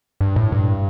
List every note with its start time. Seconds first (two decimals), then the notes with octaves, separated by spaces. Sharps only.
0.21 G2
0.36 A2
0.52 G2